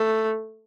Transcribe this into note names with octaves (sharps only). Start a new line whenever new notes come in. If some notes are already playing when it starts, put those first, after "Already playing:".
Already playing: A3